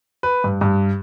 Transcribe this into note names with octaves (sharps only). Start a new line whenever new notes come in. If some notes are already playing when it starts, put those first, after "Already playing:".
B4
G2
G2